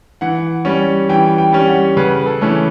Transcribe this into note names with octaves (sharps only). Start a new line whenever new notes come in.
E3 F#5
G3 C#4
E3 G5
G5
G3 C#4
F#5
C#3 B4
A4
E3 A3 C#4